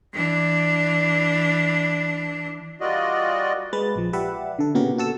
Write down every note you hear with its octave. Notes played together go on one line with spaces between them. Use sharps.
E3 D4
G3 A#3 F4 F#4 D5 D#5
G#3 B4 A6
A#1 F3
G4 B4 D5 E5 F#5
D3 A4
A#2 C#3 B3 F#4 G4 A#4
F#4 A4 E6